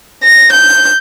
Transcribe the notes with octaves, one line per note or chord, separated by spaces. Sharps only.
A#6
G6